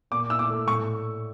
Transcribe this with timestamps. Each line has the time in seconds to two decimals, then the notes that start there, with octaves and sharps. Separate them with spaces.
0.11 A#2 D6
0.30 E4 E6
0.39 D6
0.49 A3
0.67 A2 C#6